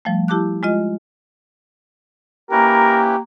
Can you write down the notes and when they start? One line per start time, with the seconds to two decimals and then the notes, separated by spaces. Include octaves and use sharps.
0.05 F3 G3 A3
0.28 E4 G4 A5 D6 F#6
0.63 G#3 F4 D#5
2.51 A#3 C#4 E4 G4 A#4 B4